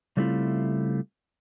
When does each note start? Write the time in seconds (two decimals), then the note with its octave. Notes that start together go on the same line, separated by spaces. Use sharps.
0.17 C#3 G3 A3 C4 E4 F4